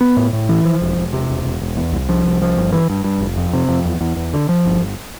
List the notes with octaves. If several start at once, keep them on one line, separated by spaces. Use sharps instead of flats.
B3
A2
A2
E3
F3
E1
E1
C3
E1
E1
E1
E2
C2
F3
C2
F3
G1
E3
G2
G2
F1
F2
C3
F2
E2
E2
E2
D3
F3
G1
G1